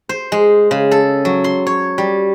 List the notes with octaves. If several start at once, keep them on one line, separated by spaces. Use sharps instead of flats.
C5
G#3
C#3
A4
F#3
C6
C#5
G3